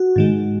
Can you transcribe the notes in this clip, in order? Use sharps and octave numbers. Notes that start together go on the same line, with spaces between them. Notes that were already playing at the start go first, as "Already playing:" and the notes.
Already playing: F#4
G#2 D#3 G#3